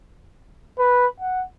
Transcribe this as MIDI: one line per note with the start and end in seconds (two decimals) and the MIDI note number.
0.78 1.06 71
1.20 1.42 78